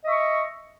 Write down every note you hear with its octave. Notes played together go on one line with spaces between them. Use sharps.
D#5 E5 C#6